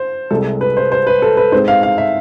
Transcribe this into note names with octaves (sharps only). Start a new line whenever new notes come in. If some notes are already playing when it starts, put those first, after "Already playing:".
Already playing: C5
C2 C3 G#3 A4
B4
C5
C5
B4
A4
B4
G#2 G#3 C4 C5
F5
F5
E5